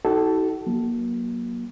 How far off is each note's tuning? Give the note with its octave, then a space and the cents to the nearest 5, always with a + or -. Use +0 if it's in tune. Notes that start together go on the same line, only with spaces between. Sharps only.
D#4 +40 F#4 +40 A4 +0
F#3 -5 A#3 +25